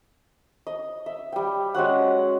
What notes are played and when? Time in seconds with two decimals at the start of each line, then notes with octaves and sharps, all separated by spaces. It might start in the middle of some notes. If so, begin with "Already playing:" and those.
0.67 D#5
1.06 E5
1.32 G3 G5
1.74 G#3 C#4 F#4 F#5